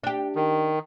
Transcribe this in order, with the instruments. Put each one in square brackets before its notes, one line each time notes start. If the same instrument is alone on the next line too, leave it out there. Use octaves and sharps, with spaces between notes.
[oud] D4 G4
[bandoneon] D#3